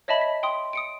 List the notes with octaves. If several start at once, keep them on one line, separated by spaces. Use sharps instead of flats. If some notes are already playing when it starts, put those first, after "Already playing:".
C#5 D#5 E5 A5 B5
B6
G5 C6 D#6
D#6 C#7 D7